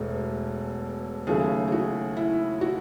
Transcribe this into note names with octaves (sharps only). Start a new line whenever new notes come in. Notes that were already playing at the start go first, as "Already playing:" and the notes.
Already playing: E1 E2 B2 A3
D#2 C#3 F#3 A3 G#4
G#4
F#4
E4
F#4